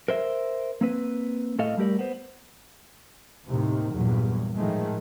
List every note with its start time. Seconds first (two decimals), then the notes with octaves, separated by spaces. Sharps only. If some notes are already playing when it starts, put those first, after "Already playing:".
0.08 A#4 C5 E5
0.81 A#3 C4 B4
1.59 A2 A3 A4 D#5 F5
1.77 G3 A3 G4 A#4 D5
1.99 B3 C5
3.47 D#2 A2 C3 D#3
3.92 E2 G2 A#2 F#3
4.55 A2 D#3 F3 G#3 A3